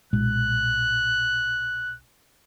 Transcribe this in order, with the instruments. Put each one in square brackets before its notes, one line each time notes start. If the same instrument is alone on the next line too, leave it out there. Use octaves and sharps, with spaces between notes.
[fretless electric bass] B1 A#2 G#3 [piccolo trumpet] F#6